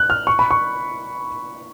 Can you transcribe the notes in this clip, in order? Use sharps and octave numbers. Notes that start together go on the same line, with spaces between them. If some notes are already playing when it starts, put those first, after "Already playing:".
Already playing: F#6
F6
C#6
B5
C#6